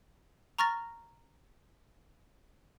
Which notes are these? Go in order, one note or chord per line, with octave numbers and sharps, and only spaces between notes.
A#5 C#6 F6 A6 A#6